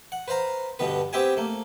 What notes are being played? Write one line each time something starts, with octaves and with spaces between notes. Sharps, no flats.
F#5
B4 C5 F5 A#5
G2 B2 D3 B3 B4
B3 C4 G4 E5 G5 G#5
A3 A#3